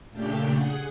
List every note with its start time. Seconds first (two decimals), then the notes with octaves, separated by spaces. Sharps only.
0.11 A#2 C#3 A3 D4 G4 G5
0.53 G#4 F#5